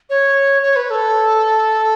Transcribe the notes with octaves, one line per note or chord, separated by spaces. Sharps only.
C#5
C#5
B4
A4